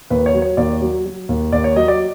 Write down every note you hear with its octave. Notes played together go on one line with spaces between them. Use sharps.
D#2 B4
C#5
F#3
C#5
D#2 D5
F#3
F#3
D#2
D#2 D5
C#5
F#3 D#5
D5